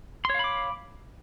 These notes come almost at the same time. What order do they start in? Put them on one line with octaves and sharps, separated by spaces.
C6 C#5 F5 B5 D6